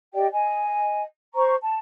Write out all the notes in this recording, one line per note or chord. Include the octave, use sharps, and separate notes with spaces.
G4 D5 D#5 G5
D#5 G#5
C5 A#5 C#6
A5